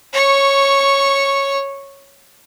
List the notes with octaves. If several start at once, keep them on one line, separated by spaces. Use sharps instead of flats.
C#5 C#6